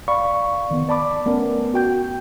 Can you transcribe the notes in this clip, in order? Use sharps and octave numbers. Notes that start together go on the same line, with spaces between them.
D5 F5 B5 C#6
D#3 B3
D5 A5 B5 D6
A3 B3 C#4 A#4
F#4 G5 G6